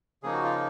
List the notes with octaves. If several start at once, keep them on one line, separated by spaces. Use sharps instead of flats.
C#3 F3 A#3 D#4 G#4
F#4
F4